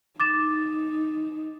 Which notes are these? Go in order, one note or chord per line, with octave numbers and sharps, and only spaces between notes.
D#4 D6 A6 E7